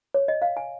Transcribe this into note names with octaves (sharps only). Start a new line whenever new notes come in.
C#5
D#5
F5
G#5